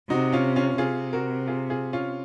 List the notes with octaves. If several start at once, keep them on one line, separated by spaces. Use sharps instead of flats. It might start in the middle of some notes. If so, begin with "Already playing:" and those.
C3 D#4 F#4
C#4 F4
C#4 F4
C3 F4 G#4
F#4 A#4
F4 G#4
F4 G#4
C#4 F4